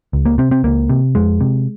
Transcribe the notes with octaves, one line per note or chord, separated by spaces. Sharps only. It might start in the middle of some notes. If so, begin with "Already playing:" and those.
C#2
A#3
C3 C4
C4
C#2 A#3
C3
F2 G#3
C3